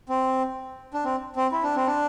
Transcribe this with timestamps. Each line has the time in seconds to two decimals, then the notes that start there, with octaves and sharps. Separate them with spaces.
0.09 C4
0.94 D4
1.05 C4
1.36 C4
1.52 E4
1.63 D4
1.75 C4
1.87 D4